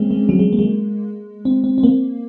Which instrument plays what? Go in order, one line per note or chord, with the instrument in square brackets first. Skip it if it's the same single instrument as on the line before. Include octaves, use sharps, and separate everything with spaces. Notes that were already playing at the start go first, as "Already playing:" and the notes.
Already playing: [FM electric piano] G#3 A#3 C4 C#4
G#3
F#3
G#3
A#3
G#3
C4
C4
C4
A#3